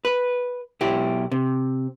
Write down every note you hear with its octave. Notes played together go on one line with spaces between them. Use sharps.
B4
B1 E4 G4
C3